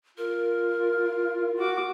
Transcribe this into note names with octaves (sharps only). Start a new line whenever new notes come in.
F4 A#4
F#4 D6